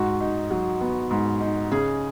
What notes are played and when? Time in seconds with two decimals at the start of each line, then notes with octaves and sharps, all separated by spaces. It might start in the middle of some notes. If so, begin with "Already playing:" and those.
Already playing: G#2 F#4
0.20 D#4
0.50 F#3
0.81 B3
1.11 G#2
1.41 D#4
1.71 C#3 G#4